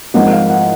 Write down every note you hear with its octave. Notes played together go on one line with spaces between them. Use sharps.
G#1 G#2 F3 A#3 F#5
F5
F#5